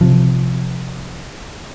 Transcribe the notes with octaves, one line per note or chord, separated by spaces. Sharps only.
C3 F3